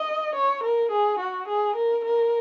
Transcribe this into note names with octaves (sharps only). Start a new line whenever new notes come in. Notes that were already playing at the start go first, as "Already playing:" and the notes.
Already playing: D#5
C#5
A#4
G#4
F#4
G#4
A#4
A#4